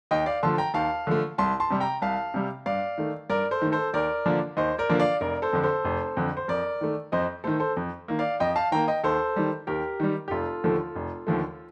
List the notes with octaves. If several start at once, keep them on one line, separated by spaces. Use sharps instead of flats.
D#2 D#5 G5
D5 F5
D3 F3 A3 A5 C6
G5 A#5
D#2 F5 A5
D3 F3 A3
C2 A5 C6
A5 C6
C3 G3
G5 A#5
C2 F5 A5
C3 G3
G2 D5 F5
D#3 A3
G2 A#4 D5
A4 C5
D#3 A3
A4 C5
D#2 A#4 D5
D3 F3 A#3 D4
D#2 C5 D#5
A#4 D5
D3 F3 A#3 D4
D5 F5
F1 A#4 D5
A4 C5
F2 D3
A4 C5
F1
F2 D3
C5
F2 A#4 D5
D#3 A3
F2 C5 D#5
D#3 A3 A4 C5
A4 C5
F2
D#3 A#3
D5 F5
F2 D#5 G5
F5 A5
D#3 A#3 G5 A#5
D#5 G5
D#2 A4 C5
D#3 G3
D#2 G4 A#4
D#3 G3
G4
F1 F4 A4
D#2 D3 F3 A3
F1
D#2 D3 F3 A3